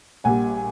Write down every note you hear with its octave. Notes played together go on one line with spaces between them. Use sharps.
A#1 A#2 G3 F#5 G#5